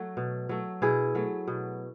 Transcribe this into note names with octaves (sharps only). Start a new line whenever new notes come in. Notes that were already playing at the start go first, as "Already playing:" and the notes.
Already playing: F#3 A3 F#4
B2
F#3 A3
B2 E4 G#4
F#3 A3
B2